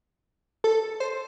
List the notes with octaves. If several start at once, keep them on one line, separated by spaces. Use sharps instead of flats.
A4
C5